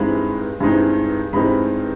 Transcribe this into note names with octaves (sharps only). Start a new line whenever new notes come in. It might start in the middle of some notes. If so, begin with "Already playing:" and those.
Already playing: G2 E3 G#3 C4 D#4 B5
G2 E3 G#3 C4 D#4
G2 E3 G#3 C4 D#4 B5